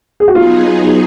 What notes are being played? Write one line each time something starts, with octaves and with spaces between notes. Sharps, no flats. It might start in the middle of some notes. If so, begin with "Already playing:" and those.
G#4
F#4
F#3 B3 D#4 F4 G#4